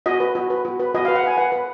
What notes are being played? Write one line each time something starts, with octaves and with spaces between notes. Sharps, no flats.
F#4 D#5
B4
F#4
B4
F#4
B4
F#4 D#5
B4 F5
F#5
B4 G#5
B4 F#5
B4